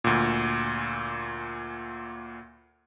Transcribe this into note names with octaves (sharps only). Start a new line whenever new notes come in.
D2 A#2